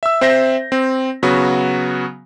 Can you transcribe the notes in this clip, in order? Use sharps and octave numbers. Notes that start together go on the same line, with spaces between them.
E5 E6
C4 C5 E5 G6 A#6
C4
C#3 F#3 B3 F#4